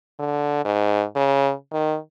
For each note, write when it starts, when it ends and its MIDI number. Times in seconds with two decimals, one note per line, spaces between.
0.19 0.62 50
0.65 1.03 44
1.16 1.52 49
1.73 1.96 51